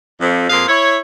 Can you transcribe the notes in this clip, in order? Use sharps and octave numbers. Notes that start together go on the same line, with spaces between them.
F2
F2 A#3 G#4 C5 F5
E4 C#5